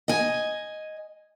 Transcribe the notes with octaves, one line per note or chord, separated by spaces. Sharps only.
D#5 G#5